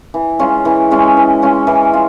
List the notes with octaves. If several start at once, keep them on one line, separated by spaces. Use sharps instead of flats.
E3
G#3 C#4 F4
E3
G#3 C#4 F4
E3
G#3 C#4 F4
E3
F4